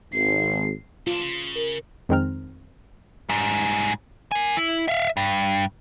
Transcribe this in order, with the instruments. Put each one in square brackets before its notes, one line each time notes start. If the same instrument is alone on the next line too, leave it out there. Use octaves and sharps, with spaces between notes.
[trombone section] G#1 [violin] C7
[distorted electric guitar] B1 D4 [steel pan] F4
[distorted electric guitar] C#3
[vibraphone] A#4
[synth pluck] F2 D#3 G#3 C4 A#4 F6
[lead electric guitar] G#2 G3
A#4 G#5
E4
E5 F5
G2